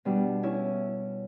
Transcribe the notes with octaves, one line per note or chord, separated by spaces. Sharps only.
B2 G3 D4
C#4 E4